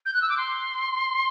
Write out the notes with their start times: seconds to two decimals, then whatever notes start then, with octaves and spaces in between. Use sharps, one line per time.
0.06 G6
0.14 F#6
0.22 E6
0.29 D6
0.37 C6